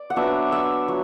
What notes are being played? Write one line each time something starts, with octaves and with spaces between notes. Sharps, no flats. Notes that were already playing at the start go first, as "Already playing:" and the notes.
Already playing: D5
F#5
F#3 B3 D4 E5
E5
F#3